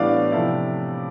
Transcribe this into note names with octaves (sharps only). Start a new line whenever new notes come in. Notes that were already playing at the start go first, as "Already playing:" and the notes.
Already playing: A2 E3 G3 B3 D4 D5 F5
C3 F3 A3 E4